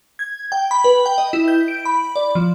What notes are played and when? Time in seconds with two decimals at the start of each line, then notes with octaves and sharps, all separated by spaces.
0.19 G#6
0.52 G5
0.71 B5
0.84 B4
1.06 G5
1.18 D#5
1.33 E4
1.48 G6
1.68 D7
1.85 B5
2.16 D5
2.35 F3